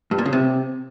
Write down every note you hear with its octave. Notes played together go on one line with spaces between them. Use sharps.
G2
A#2
C#3
C3